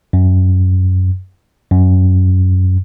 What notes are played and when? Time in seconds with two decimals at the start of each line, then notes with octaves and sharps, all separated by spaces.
0.13 F#2
1.71 F#2